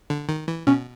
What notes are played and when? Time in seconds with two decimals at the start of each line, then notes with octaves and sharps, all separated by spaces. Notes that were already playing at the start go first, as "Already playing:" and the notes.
0.10 D3
0.29 D#3
0.48 E3
0.67 B2 C#4